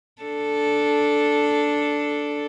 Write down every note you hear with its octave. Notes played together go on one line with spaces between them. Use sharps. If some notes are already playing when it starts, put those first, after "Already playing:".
D4 A4